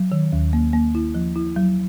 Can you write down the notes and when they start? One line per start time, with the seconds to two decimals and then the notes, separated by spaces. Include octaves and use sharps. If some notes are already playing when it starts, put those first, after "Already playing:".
Already playing: F#3
0.12 D#3
0.32 D#2
0.53 A#3
0.73 A#3
0.95 E4
1.15 F3
1.35 E4
1.56 F#3